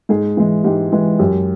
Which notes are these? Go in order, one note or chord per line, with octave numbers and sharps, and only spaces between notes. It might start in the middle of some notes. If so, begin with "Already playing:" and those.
G#2 G#4
E3 G#3
G#2 G4
E3 G#3
F#2 G4